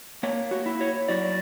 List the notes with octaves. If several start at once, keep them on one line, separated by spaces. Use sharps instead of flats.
A#3 C#5
F#4
E4
C#5
F#3 D5